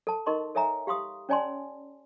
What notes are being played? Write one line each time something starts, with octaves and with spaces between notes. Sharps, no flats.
A4 A5
D#4 A#4 D#5 C6 C#6
A4 C#5 E5 G#5 A#5
G4 F5 C6 D#6
C#4 C#5 D5 G#5 A5 C6